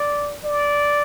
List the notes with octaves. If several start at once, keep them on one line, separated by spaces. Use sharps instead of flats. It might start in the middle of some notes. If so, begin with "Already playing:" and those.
Already playing: D5
D5